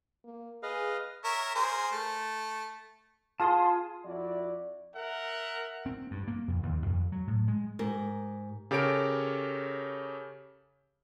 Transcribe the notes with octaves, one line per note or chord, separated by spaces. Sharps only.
A#3
G#4 B4 D#5 F5
A#4 C#5 E5
G#4 A#4 C5
A3
F4 G#4 A5 C6 D#6
F2 F3 E4 F#4 D5
A#4 E5 F#5
C4
G2
A#3
F2
D#2
F2
F#3
A2
G#3
G#2 G4 A#4
C#3 G4 A4 A#4 C#5 D7